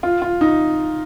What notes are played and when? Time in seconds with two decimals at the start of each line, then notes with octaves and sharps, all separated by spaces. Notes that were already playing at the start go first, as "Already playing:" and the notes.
0.03 F4
0.22 F4
0.41 D#4